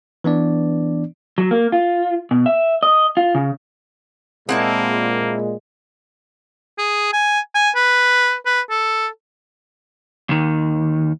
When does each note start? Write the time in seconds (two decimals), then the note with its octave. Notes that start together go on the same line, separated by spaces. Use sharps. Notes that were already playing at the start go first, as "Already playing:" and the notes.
0.24 E3 B3 D4 D5
1.38 F#3
1.51 A#3
1.72 F4
2.31 B2
2.46 E5
2.83 D#5
3.17 F4
3.35 C#3
4.49 A#2 G#3 A#3 C4 E4 G#4 F#5 A5
6.78 G#4
7.13 G#5
7.55 G#5
7.75 B4
8.46 B4
8.70 A4
10.29 D#2 D#3